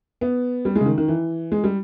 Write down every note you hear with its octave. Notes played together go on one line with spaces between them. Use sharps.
B3
G3
G#3
C#3
D#3
D#3
E3
G#3
G3